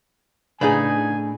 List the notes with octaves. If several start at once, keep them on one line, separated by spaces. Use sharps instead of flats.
A2 C#3 D4 D#4 G#4 B4 G#5